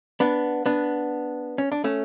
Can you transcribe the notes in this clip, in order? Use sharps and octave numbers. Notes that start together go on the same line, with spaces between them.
B3 D4
B3 D4
C#4
D4
A3 C#4